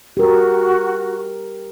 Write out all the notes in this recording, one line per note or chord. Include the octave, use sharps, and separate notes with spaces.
F#4 G4 A#4